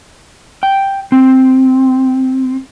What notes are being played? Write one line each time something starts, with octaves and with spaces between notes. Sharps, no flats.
G5
C4